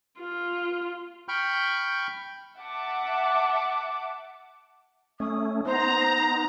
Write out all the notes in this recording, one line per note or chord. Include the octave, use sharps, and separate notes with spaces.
F4
G5 B5 C#6 F6 G6
E5 F#5 A5 D6
A3 C#4 D#6
B3 D#4 C5 A#5